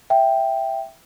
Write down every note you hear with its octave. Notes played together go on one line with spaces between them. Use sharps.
E5 G5